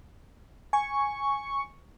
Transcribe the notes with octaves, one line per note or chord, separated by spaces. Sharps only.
G#5 C#6